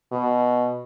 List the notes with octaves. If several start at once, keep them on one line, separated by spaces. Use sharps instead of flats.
B2